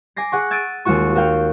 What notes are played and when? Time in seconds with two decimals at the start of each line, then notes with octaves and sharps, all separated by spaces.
0.16 G#5 D6 A#6 C7
0.32 G#4 F#5 C#6
0.51 E6 G#6 A6 D7 D#7
0.85 D#2 G#3 F4 F#4 C#6
1.15 F#4 A#4 F5 G5